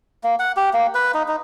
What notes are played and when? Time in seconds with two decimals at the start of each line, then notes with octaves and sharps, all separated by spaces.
0.24 A#3
0.39 F#5
0.57 G4
0.73 A#3
0.95 B4
1.14 D#4
1.28 D#4